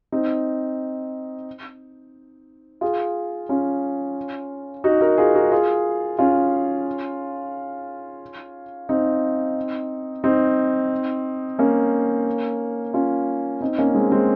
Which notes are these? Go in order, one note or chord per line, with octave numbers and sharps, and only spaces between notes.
C4 D#4
F4 G#4
C#4 F4
D#4 F#4
F#4 A#4
F4 G#4
F#4 A#4
F4 G#4
C#4 F4
C4 D#4
C4 D#4
A#3 C#4
C#4 F4
C4 D#4
A#3 C#4
G#3 C4
G#3 C4